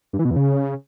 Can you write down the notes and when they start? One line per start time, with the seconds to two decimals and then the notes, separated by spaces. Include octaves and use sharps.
0.13 G2
0.19 E3
0.25 B2
0.31 E2
0.36 C#3